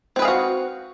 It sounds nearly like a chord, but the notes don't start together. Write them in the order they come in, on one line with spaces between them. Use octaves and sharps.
C4 B4 G#4 F5 F#4